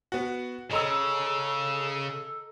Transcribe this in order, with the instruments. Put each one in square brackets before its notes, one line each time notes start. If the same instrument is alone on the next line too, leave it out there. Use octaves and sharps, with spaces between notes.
[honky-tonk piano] B3 F#4
[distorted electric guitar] C#3 [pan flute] A4 [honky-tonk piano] D#5 A#5 E6